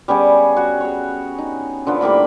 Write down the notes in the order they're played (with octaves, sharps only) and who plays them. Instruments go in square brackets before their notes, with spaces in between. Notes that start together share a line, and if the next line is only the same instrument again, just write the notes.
[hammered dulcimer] G3 B3 C#4 G#4
F#4
G#4 C#5
D#4
D3 F3 B3
A2 G3 A#3 B5